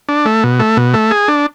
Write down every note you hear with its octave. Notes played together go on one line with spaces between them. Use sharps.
D4
A3
B2
A3
B2
A3
G#4
D4